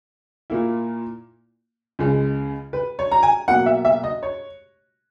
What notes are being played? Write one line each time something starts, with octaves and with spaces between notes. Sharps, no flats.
A#2 A#3 E4
C#2 C#3 G#3
B4
C#5
A#5
G#5
B2 F#3 A#3 F#5
E5
E5
D#5
C#5